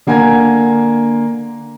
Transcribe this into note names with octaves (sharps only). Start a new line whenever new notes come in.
D3 A#3 F#5 G#5 A#5 G#6